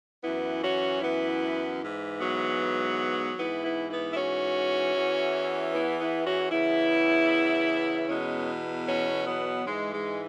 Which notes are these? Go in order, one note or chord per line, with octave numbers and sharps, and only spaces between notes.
F#2 E3 B3 E4
C#4 F#4
B3 E4
G#2 E3
F#3 B3
G#2 E3 B3 E4
B3 E4
B3 E4
E4
C#4 F#4
E2 E3
B3 E4
B3 E4
C#4 F#4
E2 C#3 E3 B3 E4
E2 B2 G#3 C#4
C#4 F#4
F#3 B3
G#2 E3 G#3
G#3